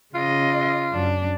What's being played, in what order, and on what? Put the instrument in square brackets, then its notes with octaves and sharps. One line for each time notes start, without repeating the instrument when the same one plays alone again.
[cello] C#3 D#5 [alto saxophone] F4
[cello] F#2 D4